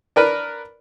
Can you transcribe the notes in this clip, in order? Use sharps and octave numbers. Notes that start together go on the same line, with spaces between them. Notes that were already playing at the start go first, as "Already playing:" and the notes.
D4 A#4 B4